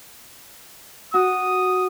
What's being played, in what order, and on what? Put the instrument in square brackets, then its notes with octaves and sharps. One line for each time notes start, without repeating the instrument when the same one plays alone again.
[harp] F#4 [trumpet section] D#6